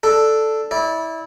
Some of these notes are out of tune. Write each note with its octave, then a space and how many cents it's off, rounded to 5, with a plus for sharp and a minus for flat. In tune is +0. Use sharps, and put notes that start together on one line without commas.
D4 +0 A4 +0
E4 -20 D5 +0